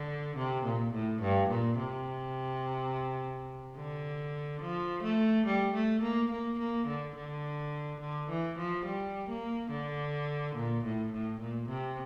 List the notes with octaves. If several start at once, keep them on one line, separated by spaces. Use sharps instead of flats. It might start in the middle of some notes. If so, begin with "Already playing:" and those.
Already playing: D3
C3
A#2
A2
G2
A#2
C3
D3
F3
A3
G3
A3
A#3
A#3
A#3
D3
D3
D3
E3
F3
G3
A#3
D3
A#2
A2
A2
A#2
C3